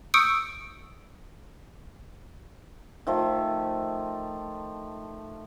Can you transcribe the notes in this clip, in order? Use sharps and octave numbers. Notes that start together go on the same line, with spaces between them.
C#6 D#6 E6 G6 C#7 D7
D#3 F3 A3